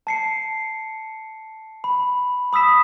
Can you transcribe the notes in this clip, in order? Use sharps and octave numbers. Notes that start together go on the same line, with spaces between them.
A5 C7 C#7
B5
B5 D#6 E6 B6 E7